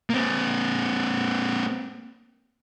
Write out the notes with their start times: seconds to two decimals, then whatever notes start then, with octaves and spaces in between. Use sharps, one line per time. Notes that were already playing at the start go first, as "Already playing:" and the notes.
0.10 A#3 C4